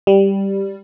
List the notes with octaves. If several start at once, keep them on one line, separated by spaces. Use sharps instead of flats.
G3